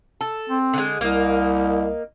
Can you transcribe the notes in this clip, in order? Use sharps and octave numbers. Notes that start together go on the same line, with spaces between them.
A4
C4
D3 G#3
C2 A#3 D#4